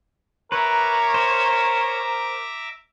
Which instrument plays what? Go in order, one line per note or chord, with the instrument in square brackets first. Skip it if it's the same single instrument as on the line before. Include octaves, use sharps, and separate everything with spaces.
[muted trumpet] A#4 [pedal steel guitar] B4 [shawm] C#5 [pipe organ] E5 A#5 D6
[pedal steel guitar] C5